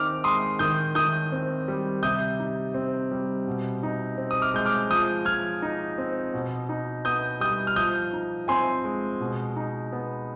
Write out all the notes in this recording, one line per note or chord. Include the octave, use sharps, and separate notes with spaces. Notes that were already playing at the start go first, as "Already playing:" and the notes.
Already playing: D#3 C4 D#4 D6 F6
G#3 C6 D#6
D#3 D#6 G6
D#3 D#6 G6
C4
G3
C3 D#6 G6
D#4
C4
G3
B2
D#4
C4
D#6
D6 F6
G#3 G6
D6 F6
F3 D#6 G6
F3 F6 G#6
D#4
C4
B2
D#4
B3 D#6 G6
G3 D#6 G6
F6
F3 D#6 G6
D#4
C4 G#5 C6
G#3
B2
D#4
B3